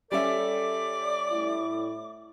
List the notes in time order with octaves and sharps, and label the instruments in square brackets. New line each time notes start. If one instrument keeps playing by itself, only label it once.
[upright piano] G3 C#4 E5 [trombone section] A4 [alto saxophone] D5 [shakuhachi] D6
[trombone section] A2 E4